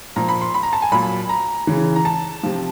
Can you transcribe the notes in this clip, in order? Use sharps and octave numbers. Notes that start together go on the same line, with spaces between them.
A#2 F3 A#5
B5
C6
B5
A#5
A5
G#5
A#2 F#3 B5
A#5
C#3 E3
A#5
A5
C3 F3